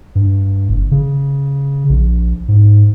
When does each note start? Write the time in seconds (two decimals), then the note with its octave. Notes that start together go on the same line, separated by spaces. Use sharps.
0.15 G2
0.69 F#1
0.91 C#3
1.89 A#1
2.48 G#2